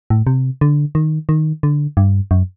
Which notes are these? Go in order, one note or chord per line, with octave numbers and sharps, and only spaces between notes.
A2
C3
D3
D#3
D#3
D3
G2
F#2